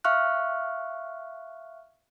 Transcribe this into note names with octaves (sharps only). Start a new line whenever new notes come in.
E5 F5 C#6 F6 F#6